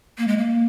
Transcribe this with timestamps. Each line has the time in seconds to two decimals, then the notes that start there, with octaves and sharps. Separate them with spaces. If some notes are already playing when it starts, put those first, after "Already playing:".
0.18 A#3
0.28 G#3
0.38 A#3